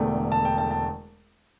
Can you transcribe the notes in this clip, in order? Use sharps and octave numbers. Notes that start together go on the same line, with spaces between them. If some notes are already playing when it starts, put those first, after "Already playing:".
Already playing: E1 E2 D3 A3 G5
A5
G5
A5
A5